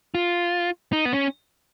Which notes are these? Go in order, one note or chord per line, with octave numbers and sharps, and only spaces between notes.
F4
D#4
B3
C#4